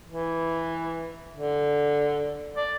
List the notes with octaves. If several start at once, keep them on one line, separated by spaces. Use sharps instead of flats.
E3
D3
D5